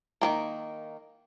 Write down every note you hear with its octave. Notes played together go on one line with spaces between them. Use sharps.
D#3 G#3 A#3